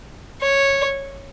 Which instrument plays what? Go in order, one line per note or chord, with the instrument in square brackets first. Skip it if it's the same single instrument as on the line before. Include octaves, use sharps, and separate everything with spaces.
[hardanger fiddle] C#5